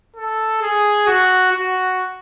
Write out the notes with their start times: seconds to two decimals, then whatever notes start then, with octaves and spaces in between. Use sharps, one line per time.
0.16 A4
0.61 G#4
1.07 F#4
1.52 F#4